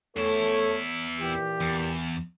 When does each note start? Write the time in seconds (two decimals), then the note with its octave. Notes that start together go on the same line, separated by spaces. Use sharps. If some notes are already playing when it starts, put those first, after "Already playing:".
0.17 E2 A3 E4 A4 C#5
1.20 A#2 E3 G4
1.61 E2